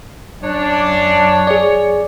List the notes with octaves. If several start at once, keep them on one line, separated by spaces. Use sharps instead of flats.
F#2 D4 C#5
G#4 D5